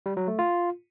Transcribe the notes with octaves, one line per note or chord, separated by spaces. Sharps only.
G3
F#3
A3
F4